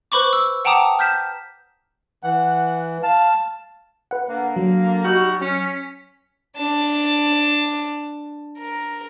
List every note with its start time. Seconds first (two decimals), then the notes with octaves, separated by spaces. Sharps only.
0.12 B4 C5 B5 C#6 D6
0.33 E6
0.65 F#5 G5 A5 A#5 D6 D#6
0.99 F6 G6 B6 E7
2.24 E3 F#5
3.03 F5 A5
4.11 B4 F#5
4.29 D3 A#3
4.56 F#3
5.04 G3 D#4 F#4
5.41 C#4
5.64 B6
6.57 D4 A5
8.58 A#4